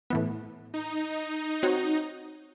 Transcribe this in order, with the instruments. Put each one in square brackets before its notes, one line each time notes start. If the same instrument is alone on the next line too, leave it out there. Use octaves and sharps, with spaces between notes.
[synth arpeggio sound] A2 E3 B3
[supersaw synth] D#4
[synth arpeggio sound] C4 F#4 C#5